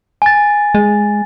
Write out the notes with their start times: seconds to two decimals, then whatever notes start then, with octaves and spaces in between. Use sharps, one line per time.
0.22 G#5 A6
0.75 G#3